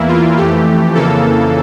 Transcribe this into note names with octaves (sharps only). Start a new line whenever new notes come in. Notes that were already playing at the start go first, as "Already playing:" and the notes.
Already playing: E2 E3 A#3 E4
F4
F2 E3 A3 G4
F2 C#3 E3 A#3 A4